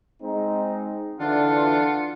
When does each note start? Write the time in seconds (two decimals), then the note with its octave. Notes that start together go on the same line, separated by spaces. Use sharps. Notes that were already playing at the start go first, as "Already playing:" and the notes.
0.22 G#3 C4 D#4
1.20 D3 E3 D4 F4 F#5